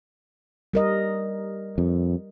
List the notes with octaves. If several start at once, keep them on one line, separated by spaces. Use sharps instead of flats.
G3 A#4 D#5
F2